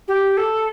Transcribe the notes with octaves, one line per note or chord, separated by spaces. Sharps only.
G4
A4